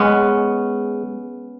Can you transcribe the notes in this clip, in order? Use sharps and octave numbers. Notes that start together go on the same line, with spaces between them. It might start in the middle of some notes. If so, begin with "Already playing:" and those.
Already playing: G#3 B3 C#4